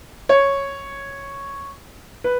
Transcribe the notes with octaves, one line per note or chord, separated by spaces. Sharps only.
C#5
B4